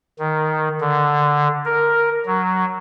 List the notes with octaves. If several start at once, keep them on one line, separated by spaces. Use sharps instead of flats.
D#3
D3
A#4
F#3